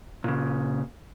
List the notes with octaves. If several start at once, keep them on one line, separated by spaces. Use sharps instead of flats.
A#2 C#3